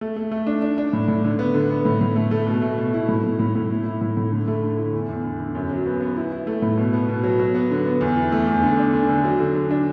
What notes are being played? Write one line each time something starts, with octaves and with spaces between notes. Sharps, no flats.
A3
A3
A3
D4
D4
D4
A2
A2
D3
B3
D3
B3
A2
A2
A3
A3
B2
A3
B2
E4
A2
A2
A2
A2
E4
E4
A2
A2
D3
A3
D3
E4
E2
E2
D3
D3
F#2
F#3
B3
B3
E4
E4
A3
A2
B2
B3
B2
F#3
F#3
B3
D3
B3
E2
E3
A3
E2
D3
D4
D3
D3
F#3
D3
D3
D4